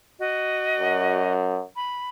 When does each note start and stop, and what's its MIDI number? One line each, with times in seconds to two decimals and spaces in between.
0.18 1.31 66
0.18 1.31 75
0.79 1.62 42
1.76 2.09 83